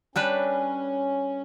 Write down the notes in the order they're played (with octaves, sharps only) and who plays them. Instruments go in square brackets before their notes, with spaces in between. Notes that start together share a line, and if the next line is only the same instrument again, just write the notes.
[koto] G3 D4 B4 [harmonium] C#4